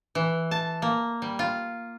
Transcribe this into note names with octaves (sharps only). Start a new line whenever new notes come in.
E3
A5
A#3
G3
F4